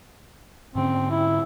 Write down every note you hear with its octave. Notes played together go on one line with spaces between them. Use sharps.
G#2 D3 C4 C#4
E4